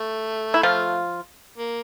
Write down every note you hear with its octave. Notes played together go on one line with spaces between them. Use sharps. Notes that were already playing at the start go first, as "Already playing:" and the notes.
Already playing: A3
E4
F3 F4
A#3